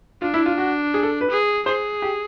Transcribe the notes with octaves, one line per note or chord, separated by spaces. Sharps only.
D4 F4
E4
F4
F#4
G#4
A4
B4
G#4
G#4 C5
G4